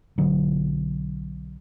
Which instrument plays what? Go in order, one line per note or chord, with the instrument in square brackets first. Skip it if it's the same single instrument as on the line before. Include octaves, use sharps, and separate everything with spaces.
[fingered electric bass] B1 D3 F#3